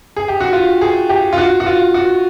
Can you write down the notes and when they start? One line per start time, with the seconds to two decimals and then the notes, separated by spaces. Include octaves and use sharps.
0.17 G#4
0.28 G4
0.41 F#4
0.53 F4
0.81 G#4
1.09 G4
1.33 F4
1.38 F#4
1.60 F#4
1.66 F4
1.94 F#4